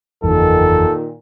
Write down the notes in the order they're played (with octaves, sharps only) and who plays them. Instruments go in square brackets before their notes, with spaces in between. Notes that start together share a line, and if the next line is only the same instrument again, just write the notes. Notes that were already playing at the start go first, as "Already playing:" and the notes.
[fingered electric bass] F#1 E2 [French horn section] A#2 D#3 [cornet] A4